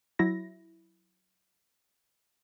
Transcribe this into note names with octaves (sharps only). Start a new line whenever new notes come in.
F#3 E4 A#6